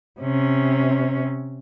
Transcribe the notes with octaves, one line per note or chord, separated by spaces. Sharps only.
C3 C#4